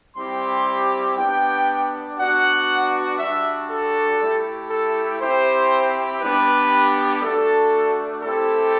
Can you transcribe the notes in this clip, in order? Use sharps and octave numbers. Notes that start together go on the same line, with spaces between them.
G3 C4 E4 G4 C6
B3 D4 G4 G5
B3 D4 F#4 F#5
G3 D4 F#4 E5
A4
A3 E4 G4
A4
C4 E4 G4 C5
G3 B3 D4 G4 B4
A3 D4 F#4 A4
A3 C4 E4 G4 A4